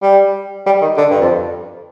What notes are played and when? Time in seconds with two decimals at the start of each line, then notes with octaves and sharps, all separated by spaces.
0.02 G3
0.66 G3
0.81 D#3
0.98 D3
1.11 G2
1.21 F2